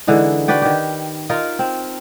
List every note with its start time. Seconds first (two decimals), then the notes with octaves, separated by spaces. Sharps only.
0.07 D3 E3 G#3 D#4
0.48 F#4 B4 D5 G5
0.62 D#3 G4
1.29 D#4 F4 A#4
1.59 C4